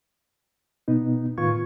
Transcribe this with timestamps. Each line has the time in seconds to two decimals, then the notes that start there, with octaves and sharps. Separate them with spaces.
0.88 B2 B3 D#4
1.38 A2 D#3 F4 B4 C#6 G#6